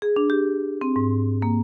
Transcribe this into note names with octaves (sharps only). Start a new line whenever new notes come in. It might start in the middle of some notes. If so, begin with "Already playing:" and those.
G#4
D4
G4
C4
G#2
A#3